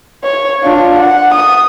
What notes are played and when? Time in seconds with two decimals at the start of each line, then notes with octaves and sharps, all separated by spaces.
0.24 C#5
0.63 D4 F4
0.99 F#5
1.35 D#6